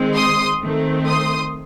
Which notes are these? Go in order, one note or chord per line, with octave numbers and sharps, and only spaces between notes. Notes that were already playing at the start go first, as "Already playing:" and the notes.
Already playing: D#3 G#3 C4
C6 D#6
D#3 A3 C4
C6 D#6